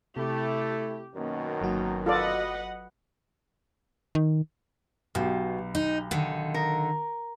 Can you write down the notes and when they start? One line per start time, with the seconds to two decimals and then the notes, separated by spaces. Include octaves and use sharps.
0.16 C3 A3 E4 G4
1.15 F#2 B2 D#3 A#3 C#4
1.61 G1 F#3 A#3 D#4 F#4
2.06 F4 A4 B4 D5 D#5 F#5
4.15 D#3
5.15 B1 B2 G4
5.75 D#4
6.11 D3 D#3
6.54 A#4